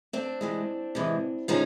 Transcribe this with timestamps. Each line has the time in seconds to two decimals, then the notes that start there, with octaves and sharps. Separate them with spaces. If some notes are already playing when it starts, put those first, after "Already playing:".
0.13 C4 D4
0.41 C3 E3 G#3
0.95 C3 E3 G#3
1.48 D3 F3 G#3 C#4 D#4